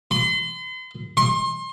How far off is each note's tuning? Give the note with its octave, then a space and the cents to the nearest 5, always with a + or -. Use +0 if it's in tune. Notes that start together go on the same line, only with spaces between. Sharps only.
C6 -40
C6 +30